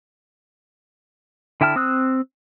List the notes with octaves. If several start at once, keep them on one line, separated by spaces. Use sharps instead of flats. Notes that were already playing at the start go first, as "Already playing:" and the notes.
D3 E4 G5 A5 F6
C4 D#6 E6 F#6